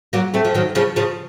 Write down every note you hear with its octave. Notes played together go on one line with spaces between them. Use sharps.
F#3 A#3
A3 C4
F3
D#3 F#3
C#3 F3
C#3 F3